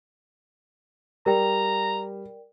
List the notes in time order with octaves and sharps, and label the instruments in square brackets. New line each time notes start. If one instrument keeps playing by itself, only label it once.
[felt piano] G3 [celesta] A#4 D5 G5 [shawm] A#5